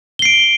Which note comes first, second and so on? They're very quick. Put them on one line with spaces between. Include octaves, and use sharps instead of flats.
G7 C7 D7